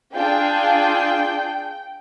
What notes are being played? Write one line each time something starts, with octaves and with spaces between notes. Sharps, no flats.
D4 F4 G#4 G5